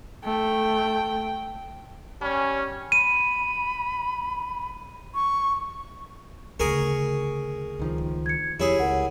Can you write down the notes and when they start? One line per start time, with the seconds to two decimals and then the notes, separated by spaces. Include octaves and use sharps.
0.25 A3 G5
2.22 G3 C#4
2.92 B5 D#7
5.15 C#6
6.60 D2 C#3 G#4 A#4 C#6
7.79 C#2 D#3 F3
8.26 G#6 C#7
8.60 F2 E4 G4 G#4 C#5
8.79 C#2 A#4 F#5